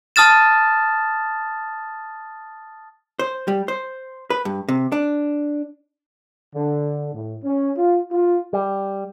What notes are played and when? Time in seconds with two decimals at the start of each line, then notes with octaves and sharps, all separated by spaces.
0.16 A5 D#6 F6 A6 E7
3.19 C5
3.48 G3
3.68 C5
4.30 B4
4.45 G2
4.68 C3
4.92 D4
6.55 D3
7.14 A2
7.43 C#4
7.77 F4
8.12 F4
8.53 G3